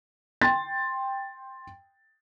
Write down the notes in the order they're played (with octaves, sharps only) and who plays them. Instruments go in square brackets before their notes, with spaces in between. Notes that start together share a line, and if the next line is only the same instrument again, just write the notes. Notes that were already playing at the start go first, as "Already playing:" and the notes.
[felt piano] G5 C6 A6